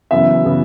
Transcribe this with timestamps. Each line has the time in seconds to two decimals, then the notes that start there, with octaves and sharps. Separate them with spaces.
0.11 F#2 C#3 E3 B3 E5
0.45 C#3 E3 B3